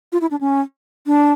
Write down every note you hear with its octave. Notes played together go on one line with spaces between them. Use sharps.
F4
E4
D4
C#4
D4